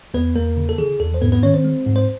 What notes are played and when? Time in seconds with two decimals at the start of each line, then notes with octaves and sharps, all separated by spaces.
0.14 E2 B3 B4
0.35 E2 A#3 A#4
0.57 C#3
0.69 A4
0.78 E3 G#4
1.00 E2 A4
1.14 C5
1.22 G#2 B3 B4
1.32 B3 B4
1.43 D#3 C#4 C#5
1.54 C4 C5
1.65 G#3
1.86 G#2
1.96 C5